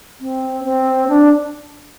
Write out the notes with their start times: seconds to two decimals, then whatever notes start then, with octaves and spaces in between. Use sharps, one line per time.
0.20 C4
0.64 C4
1.08 D4